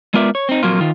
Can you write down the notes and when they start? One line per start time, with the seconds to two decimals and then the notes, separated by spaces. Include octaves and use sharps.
0.14 G#3 B3 F4 A#4 D5 E5
0.35 C#5
0.49 C4 D#4
0.63 F2 A#2 F#3 A#3 F4
0.80 D#3 F4